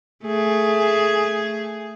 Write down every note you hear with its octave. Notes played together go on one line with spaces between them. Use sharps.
A3 G#4